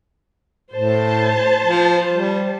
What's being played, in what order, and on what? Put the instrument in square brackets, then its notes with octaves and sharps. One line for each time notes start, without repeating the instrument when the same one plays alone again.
[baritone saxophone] A2 [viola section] C5 A5
[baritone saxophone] F3
G3